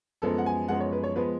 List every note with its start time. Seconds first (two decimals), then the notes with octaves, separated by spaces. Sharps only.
0.22 F#2 F3 G#3 B3 A4
0.38 F#5
0.46 G#5
0.68 F#2 F3 G#3 B3 F#5
0.80 C#5
0.92 B4
1.03 C#5
1.16 F3 G#3 B3 B4